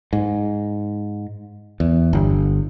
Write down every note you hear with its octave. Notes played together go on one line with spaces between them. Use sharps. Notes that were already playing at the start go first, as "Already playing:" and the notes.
G#2
E2
G1